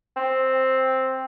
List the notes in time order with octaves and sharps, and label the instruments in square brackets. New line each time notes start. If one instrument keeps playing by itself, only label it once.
[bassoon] C4